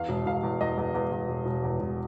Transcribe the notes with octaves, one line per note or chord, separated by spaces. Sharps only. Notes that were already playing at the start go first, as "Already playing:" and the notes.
Already playing: E2 F5
E1
E1 F5
E2
E2 D#5
E2
E2
E2
E1
E1
E2
E1